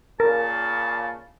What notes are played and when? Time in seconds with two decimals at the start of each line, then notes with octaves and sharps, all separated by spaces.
0.20 A#2 C#3 A#4 A5